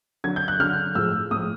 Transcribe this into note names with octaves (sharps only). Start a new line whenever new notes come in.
D3 F#3 G#6
G6
F#6
D3 F#3 F6
A2 F3 G#3 E6
A2 F3 G#3 D#6